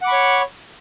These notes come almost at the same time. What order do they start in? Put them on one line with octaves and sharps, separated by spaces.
F#5 D6 B5 C#6 C#5